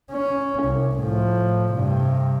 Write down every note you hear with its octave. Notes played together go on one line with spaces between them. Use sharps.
C#4
C2
A2 F3
G2 C3